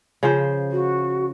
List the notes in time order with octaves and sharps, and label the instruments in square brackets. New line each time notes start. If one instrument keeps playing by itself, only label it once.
[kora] C#3 F3 C5
[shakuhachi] F#4